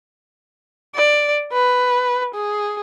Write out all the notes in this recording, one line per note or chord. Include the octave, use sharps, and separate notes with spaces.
D5
B4
G#4